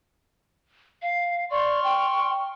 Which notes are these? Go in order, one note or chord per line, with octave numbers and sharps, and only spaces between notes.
F5
D5 C6 C#6 F6
G5